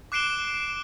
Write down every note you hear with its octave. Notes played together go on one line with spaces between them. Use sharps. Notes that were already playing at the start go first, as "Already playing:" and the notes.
D6 F#6 C7 D7 E7 G7